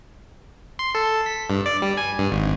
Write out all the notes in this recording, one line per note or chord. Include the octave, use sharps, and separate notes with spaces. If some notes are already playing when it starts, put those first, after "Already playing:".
C6
A4
B6
G2
D5
G3
G#5
G2
G#1